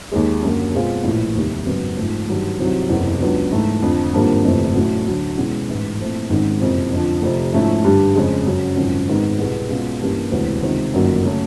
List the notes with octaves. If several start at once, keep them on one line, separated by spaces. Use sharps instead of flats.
D#2 D#3 G#3
F#2 D3 F#3 A#3
B2 G#3 C4 F4 G#4
A#1 A2 E3
F1 D#2 D#3 G3
G#1 F#2 C#3 F#3 B3
G#2 F3 A3
G2 D#3 F#3
C2 C3 D#3 F#3
F#1 E2 C3
C#2 C#3 F#3 B3 D4
G#2 E3 A3
F2 D3 F3
G#1 G2 D3 F3 A#3
G1 F2 C3 E3 A3
A2 F#3 A3 C#4 F#4
D2 D3 F#3 A3
E1 E2 B2 G#3 C#4
A1 G#2 E3
A#2 F3 A3 C4 E4
G#1 G#2 D#3 G#3 C#4
F#1 F2 C3
F2 D3 F3
F1 F2 C3
G#2 F3 A3 C#4 E4
G2 D3 G3
F2 C#3 F3 G#3
F#2 C#3 F#3
G#1 F#2 C#3 F3
G#1 G#2 D#3 G#3 B3
C2 B2 G#3 B3
B2 G#3 C#4 F4
G2 E3 G3 A#3 C#4
E1 D2 C3 E3
C#2 C3 D#3
G1 F#2 D#3 F#3 A#3
C#3 F#3 A3